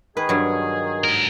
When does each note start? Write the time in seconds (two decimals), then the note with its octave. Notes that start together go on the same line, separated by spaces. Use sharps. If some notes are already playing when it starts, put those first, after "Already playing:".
0.17 D#3 G#4 B4
0.29 G2 F#3
1.04 G#2 A#4